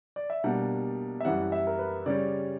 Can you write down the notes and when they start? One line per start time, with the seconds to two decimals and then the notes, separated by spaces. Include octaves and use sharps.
0.16 D5
0.30 E5
0.44 B2 G3 A#3 D4 F#5
1.20 E5
1.25 F#2 E3 G3 F#5
1.52 E5
1.67 A#4
1.79 B4
2.06 C#3 G3 C#4 D5